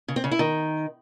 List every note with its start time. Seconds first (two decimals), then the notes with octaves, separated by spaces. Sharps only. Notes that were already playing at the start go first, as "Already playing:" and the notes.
0.08 C#3
0.16 C4
0.24 C#3
0.31 E4
0.39 D#3